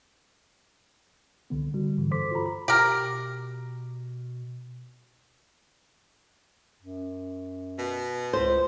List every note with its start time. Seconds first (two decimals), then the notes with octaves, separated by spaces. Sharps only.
1.50 C2 D3 B3
1.74 D3 G3 F#4
1.97 G#2 D3 E3
2.11 G2 A4 C5 C6 D6 B6
2.31 F4 F#4 A4 C5 A#5 B5
2.46 B5
2.68 B2 G4 A#4
6.83 F#2
7.78 B2
8.33 C#2 C5